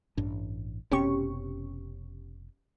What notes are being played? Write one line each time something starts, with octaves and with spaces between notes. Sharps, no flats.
A1 G2 D4
F1 B2 C4 C#4 G4 C#6